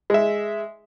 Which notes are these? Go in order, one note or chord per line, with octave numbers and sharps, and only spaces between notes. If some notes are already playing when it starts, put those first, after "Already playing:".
G#3 E5